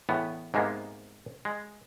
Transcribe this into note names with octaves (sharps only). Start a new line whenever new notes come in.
E2 A2 B3
G#2 C3 G#3 A#3 B3
G#3